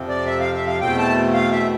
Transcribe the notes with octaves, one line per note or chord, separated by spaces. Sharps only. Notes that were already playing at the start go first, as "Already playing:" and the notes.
Already playing: F2 C3 F3 C4
D5
E5
F5
E5
F5
E2 B2 A3 C4 G5
A5
F5
E5